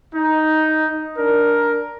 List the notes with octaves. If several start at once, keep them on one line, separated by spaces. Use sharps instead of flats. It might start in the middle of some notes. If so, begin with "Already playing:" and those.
D#4
D4 A#4